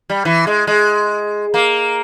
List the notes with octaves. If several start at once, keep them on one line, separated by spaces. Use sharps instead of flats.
G3
E3
G#3
G#3
A#3